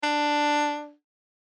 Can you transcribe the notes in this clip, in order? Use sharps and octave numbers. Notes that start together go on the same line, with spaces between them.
D4